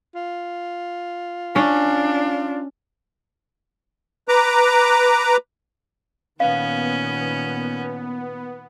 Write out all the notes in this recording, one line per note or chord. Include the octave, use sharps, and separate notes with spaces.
F4
C#4 D4
B4 A#5 D6
A#2 D#3 B3 C#4 F5